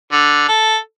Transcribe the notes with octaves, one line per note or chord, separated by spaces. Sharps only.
D3
A4